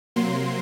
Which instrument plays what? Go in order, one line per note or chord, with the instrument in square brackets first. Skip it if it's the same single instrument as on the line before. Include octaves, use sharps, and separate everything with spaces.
[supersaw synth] C3 F#3 A#3 C6